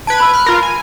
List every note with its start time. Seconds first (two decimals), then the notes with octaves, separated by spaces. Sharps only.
0.07 B4 A5 G#6 D7
0.20 B5 E6
0.33 F6 F#6
0.46 F4 A#4
0.62 G#5